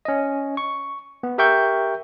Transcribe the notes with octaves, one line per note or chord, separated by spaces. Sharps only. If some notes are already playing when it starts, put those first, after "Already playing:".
C#4 D#5
C#6
B3
G4 A#4 E5 G5 C#6 G6